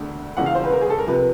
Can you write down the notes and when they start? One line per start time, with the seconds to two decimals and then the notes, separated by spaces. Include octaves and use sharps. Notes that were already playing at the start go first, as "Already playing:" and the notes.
Already playing: E1 D2 D3
0.37 E1 E2 C#3 F#5
0.46 F5
0.55 C5
0.64 B4
0.72 A#4
0.81 G#4
0.90 A4
0.98 A#4
1.07 C3 F3 B4